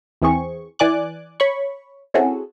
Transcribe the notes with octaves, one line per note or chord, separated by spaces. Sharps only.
E2 E3 C4 G#4 C#6
E3 D5 G#5 D6 F#6
C#5 B5 C#6
C4 C#4 E4 F#4 G#4 A4